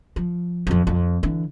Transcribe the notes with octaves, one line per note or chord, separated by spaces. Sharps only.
F3
F2 F3
F2
D3 E3